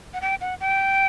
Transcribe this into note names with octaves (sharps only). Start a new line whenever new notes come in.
F#5
G5
F#5
G5